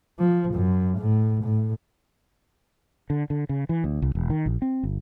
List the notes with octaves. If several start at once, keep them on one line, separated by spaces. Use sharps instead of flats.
F3
F#2
A2
A2
D3
D3
C#3
E3
D2
C2
E1
D#3
A#1
C4
G1